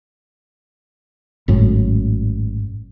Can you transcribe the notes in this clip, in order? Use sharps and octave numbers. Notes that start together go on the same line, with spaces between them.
G#1 F#2 A2